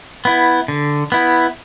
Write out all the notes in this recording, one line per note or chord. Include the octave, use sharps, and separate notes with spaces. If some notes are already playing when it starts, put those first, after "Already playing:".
B3 E4
D3
B3 E4